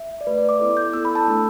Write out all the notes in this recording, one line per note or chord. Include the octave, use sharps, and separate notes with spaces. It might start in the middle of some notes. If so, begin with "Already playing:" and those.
Already playing: E5
D5
A3 G4 B4
D5
D6
B3 E4 A4
G6
B3 E4 A4 E6
B5
A5
A3 D4 A4